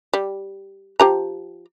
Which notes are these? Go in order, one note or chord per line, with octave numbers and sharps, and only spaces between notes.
G3
F3 G4 A#5